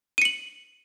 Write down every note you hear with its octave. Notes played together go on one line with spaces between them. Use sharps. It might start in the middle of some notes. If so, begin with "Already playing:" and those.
C#7 D#7 F#7